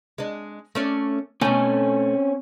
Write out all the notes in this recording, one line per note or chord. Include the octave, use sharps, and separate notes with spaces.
G#3 D4
A3 C#4 D5
B2 A3 C4 C#4 G#5